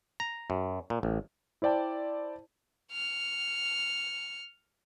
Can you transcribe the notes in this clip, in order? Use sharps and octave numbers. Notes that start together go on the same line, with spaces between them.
A#5
F#2
A#2
A1
E4 C5 D5 G5 A5
F6 C#7